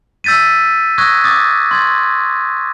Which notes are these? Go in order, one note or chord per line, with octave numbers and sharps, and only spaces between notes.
E6 G6 A6 B6 D#7
C#6 D#6 E6 F#6 G#6 A#6
D6 D#6 A6
C6 G#6 A6